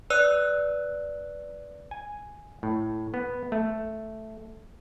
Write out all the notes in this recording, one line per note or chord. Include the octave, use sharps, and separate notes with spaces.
B4 D5 E6 F#6
G#5
A2
B3
A3